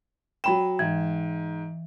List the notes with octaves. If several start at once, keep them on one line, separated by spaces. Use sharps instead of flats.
F#3 G5 B5 E7
G#2 E3